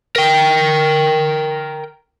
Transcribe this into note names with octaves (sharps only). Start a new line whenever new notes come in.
A#4 G5